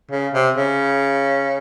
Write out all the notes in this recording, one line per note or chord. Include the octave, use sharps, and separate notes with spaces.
C#3
C3
C#3